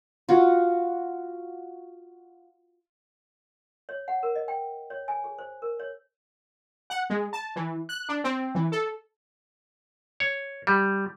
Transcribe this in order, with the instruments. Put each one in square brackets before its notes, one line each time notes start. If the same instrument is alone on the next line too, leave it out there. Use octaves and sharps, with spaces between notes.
[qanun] F4 F#4
[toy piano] C#5
F#5
A#4
D#5
G5
C#5
G#5
G#4
C5
A#4
C#5
[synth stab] F#5
G#3
A5
E3
F#6
D4
C4
E3
A4
[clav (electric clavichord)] C#5
G3